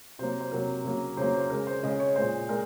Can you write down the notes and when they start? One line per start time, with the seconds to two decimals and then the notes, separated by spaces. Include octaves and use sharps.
0.19 C3 F#3 A#3 C5
0.41 C5
0.51 C3 F#3 A#3 A#4
0.84 C#3 F#3 A#3
1.17 C#3 F#3 A#3 C5
1.34 C5
1.50 C#3 G#3 A#4
1.67 C5
1.83 C#3 G#3 D#5
2.00 C#5
2.16 A#2 G#3 C5
2.49 A#2 G#3 A#4